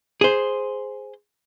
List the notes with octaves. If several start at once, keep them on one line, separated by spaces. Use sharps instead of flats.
G#4 C5